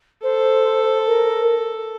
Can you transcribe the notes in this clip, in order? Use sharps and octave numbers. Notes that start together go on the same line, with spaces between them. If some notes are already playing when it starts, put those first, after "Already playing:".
A4 C5
A#4